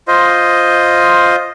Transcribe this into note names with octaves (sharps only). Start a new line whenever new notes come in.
F4 C5 D#5